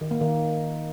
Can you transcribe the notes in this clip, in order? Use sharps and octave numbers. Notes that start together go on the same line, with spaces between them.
D#3
A#3
D#3